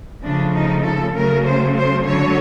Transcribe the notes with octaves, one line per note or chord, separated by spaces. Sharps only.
C#3 F3 A3 D4
D#4
A4
C#3 F#3 A3 A#4
C5
C5
D3 F#3 A3 C#5